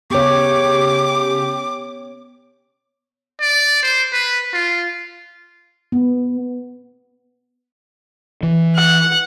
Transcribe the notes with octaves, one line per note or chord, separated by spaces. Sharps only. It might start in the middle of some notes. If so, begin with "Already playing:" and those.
C#3 B3 G4 C#5 D6
D5
C5
B4
F4
B3
E3
F#5